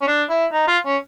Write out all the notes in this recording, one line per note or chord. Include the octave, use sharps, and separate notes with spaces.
C#4
D4
E4
D#4
F4
C#4